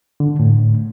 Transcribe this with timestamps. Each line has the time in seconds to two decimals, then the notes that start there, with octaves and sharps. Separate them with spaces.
0.20 D3
0.40 A2